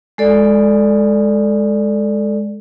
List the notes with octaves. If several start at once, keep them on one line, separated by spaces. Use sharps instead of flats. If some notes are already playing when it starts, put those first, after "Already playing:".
G#3 A4 D5